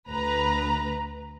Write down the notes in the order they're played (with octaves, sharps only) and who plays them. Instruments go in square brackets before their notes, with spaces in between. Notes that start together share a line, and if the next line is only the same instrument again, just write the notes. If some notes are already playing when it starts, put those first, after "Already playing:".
[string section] D2 B4 A#5